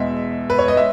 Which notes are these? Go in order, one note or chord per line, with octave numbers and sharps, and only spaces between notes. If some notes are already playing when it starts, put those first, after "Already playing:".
Already playing: E2 B2 G#3 E5
B4
C#5
D#5
G#3 E5